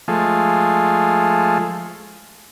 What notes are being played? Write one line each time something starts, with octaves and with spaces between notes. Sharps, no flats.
F3 G#3 A3